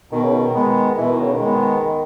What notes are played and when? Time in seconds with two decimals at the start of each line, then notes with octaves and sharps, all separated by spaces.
0.11 B2 D#3
0.23 C#3
0.34 D#3
0.54 G#3 B3
0.98 B2 E3
1.10 D#3
1.21 C#3
1.32 D#3
1.41 G#3 B3